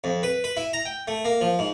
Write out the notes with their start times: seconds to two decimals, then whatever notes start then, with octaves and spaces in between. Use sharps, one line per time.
0.04 F2
0.23 B4
0.44 B4
0.57 E4
0.73 A#5
0.85 G5
1.07 A3
1.25 A#3
1.41 F3
1.59 G#2